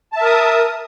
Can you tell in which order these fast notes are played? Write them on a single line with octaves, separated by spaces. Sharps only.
A5 E5 A#4 D#6